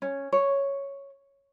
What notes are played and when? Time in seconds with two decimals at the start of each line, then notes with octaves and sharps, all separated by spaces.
0.02 C#4
0.32 C#5